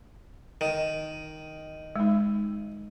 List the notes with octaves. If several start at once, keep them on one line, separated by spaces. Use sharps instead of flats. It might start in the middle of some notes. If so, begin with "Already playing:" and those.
D#3
G#3 D#4